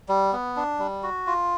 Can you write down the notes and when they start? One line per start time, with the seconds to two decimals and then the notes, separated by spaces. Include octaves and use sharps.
0.09 G3
0.33 B3
0.56 D4
0.79 G3
1.03 F#4
1.27 F4